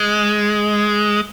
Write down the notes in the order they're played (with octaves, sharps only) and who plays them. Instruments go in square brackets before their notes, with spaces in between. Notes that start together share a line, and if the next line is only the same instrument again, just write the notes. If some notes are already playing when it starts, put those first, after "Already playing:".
Already playing: [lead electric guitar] G#3